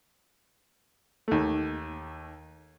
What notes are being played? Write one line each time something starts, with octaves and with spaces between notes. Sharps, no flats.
D#2 A3